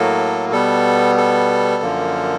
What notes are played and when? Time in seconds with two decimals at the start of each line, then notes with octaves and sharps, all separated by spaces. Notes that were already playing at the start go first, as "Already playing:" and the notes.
Already playing: A2 F#3 A#3 A4
0.52 B2 G3 B3 A4
1.17 A4
1.83 F#2 D3 F3 A#3